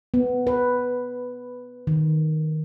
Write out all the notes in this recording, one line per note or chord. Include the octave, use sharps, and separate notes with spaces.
B3
B4
D#3